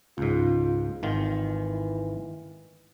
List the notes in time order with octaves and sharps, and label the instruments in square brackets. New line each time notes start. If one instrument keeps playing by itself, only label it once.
[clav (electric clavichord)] C#2 G#2 [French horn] F4
[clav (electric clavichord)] G#1 D#3 F4 [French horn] E3